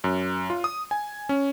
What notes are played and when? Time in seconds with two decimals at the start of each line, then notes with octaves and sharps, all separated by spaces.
0.04 F#2
0.50 F4
0.64 D#6
0.91 G#5
1.29 C#4